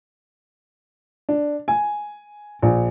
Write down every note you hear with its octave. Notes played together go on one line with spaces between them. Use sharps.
D4
G#5
A#1